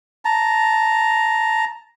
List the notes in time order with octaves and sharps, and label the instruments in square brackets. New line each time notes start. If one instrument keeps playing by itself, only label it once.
[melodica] A5 A#5